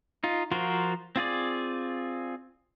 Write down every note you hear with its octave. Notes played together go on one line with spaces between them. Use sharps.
D#4 F4
F3 F4 F#4 A#4 C5
C4 F4 G#4 D5